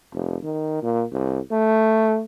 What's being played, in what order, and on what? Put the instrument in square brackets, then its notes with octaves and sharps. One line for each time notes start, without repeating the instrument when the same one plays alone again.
[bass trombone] F1
D#3
A#2
C2
A3